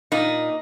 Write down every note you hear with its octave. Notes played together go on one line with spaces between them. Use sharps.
A#2 D#4